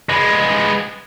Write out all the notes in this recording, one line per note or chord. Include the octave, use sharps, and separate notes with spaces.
G#3 B3